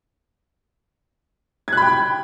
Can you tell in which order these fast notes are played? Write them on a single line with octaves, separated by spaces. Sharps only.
G#6 F#6 B5 G5